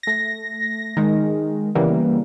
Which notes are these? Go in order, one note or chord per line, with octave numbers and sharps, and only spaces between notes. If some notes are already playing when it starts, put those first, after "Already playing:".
A3 A#6
D#3 G#3
C#3 E3 G3 A#3 B3